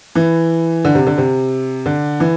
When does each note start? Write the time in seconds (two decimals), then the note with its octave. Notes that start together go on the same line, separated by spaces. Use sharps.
0.15 E3
0.85 D3
0.95 C3
1.07 D3
1.18 C3
1.86 D3
2.20 E3